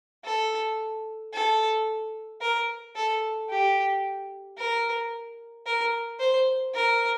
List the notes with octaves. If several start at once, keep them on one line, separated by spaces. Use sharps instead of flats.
A4
A4
A#4
A4
G4
A#4
A#4
C5
A#4